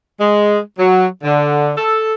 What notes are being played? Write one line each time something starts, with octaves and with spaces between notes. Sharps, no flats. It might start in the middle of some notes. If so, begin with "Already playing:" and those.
G#3
F#3
D3
A4